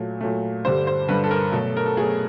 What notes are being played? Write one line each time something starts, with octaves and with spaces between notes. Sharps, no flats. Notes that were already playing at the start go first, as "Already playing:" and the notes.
Already playing: A#2 F#3 A3
A#2 F#3 A3
G2 D3 G3 C5
C5
G2 D3 G3 B4
A4
A#4
B2 F#3 A3 A4
A#4
A4
B2 F#3 A3 G#4